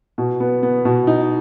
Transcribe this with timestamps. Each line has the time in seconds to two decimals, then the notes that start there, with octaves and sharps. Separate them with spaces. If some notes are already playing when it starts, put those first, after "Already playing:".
0.18 B2
0.40 B3
0.63 B3
0.85 B2
1.07 D#4